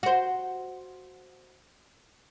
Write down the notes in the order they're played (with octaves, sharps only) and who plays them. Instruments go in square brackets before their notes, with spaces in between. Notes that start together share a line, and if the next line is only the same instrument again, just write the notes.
[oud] F#4 C5